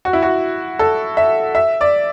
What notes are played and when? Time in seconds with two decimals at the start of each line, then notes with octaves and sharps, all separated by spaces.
0.05 F#4
0.13 E4
0.23 F#4
0.79 A4
1.17 E5
1.55 E5
1.81 D5